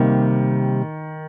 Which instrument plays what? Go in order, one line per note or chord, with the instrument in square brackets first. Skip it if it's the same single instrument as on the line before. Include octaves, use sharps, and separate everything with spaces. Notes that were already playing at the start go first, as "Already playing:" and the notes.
Already playing: [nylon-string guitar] C3 G3 A#3 [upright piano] D#3